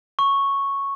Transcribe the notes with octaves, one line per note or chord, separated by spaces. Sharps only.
C#6